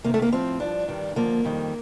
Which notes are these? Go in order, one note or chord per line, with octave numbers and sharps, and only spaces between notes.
D2 C3 D#3 A#3
A3
A#3
A2 F3 C4
G2 F3 D4
G2 D#3 G3
D#2 D3 F3 A#3
F2 D#3 G3